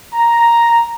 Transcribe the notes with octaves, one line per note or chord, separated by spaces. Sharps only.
A#5